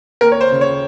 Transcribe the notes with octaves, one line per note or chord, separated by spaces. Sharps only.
D#2 A#4
C#5
C5
C#3
C#5